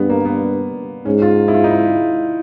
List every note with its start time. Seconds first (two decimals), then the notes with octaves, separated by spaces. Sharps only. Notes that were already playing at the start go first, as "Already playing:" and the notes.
Already playing: G2 B3
0.10 A#3
0.25 B3
1.05 G#2 C#4
1.22 F4
1.48 E4
1.54 F4
1.64 D#4
1.71 E4